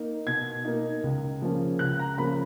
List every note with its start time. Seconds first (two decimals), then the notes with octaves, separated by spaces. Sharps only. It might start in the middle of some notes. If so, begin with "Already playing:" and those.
Already playing: A#3 D#4
0.27 B2 G#6
0.65 A#3 D#4
1.04 C#2
1.42 C#3 F3 A#3 C#4
1.79 C#2 F#6
1.99 A#5
2.18 C#3 F3 A#3 C#4 B5